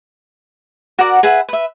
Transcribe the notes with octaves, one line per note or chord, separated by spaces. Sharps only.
F#4 A#4 D5 F#5
G#4 B4 E5 F#5
B4 E5